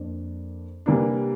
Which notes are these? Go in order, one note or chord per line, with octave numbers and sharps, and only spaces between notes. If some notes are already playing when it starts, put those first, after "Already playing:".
Already playing: F2 A#3 D4
C3 E3 G3 A#3 D4